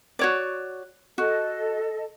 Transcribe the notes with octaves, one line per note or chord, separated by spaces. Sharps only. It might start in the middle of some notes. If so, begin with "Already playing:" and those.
F#4 C#5 D5
F#4 A4 D#5